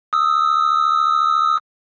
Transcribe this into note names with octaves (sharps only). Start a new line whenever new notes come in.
D#6 E6